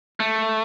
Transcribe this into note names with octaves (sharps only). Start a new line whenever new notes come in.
A3